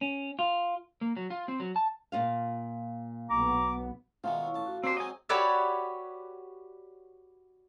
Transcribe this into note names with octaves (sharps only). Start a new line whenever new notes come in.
C#4
F4
A#3
F#3
F4
C4
F#3
A5
A#2 F4 F5
B1 B3 A#5 D6
B2 D#3 G#3 F4 E5
E4 C#5 C#6
A1 A5
F#4
A#3 C4 D4 G4 C5
F#3 G#3 C4 D#5 G#5
F#4 G4 B4 C#5 D5 E5